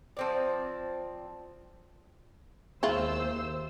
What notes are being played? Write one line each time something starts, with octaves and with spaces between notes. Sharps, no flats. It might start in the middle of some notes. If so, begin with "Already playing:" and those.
F3 C4 D5
D#2 G#3 E4 F4 C5 E6